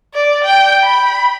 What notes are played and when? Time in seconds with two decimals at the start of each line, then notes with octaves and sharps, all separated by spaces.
0.14 D5
0.44 G5
0.84 B5